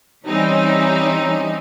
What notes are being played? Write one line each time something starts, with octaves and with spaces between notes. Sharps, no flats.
E3 G3 C4 C#4 D#4